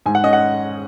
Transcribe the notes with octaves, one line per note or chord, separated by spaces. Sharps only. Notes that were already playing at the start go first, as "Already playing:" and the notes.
G#2 G#5
F#5
C#4 D#5
F#5